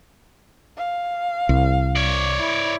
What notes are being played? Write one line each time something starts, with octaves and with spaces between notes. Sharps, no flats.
F5
C2
C#5 D5
E4